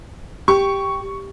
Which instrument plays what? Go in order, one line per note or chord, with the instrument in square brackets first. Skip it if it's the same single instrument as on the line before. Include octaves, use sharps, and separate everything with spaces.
[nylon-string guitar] G4 [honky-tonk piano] C#6